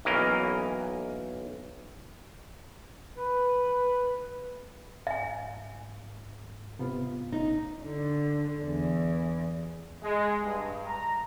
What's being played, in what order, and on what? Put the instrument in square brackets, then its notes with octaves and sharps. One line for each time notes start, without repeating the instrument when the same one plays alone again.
[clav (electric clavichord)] B1 E3 A#3 C#4 A#4 D#5
[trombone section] B4
[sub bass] G#2 [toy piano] E5 G#5
[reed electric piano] C3 B3 F4
[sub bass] G#1 [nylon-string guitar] D#4
[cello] D3
E2
[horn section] G#3
G2
A#5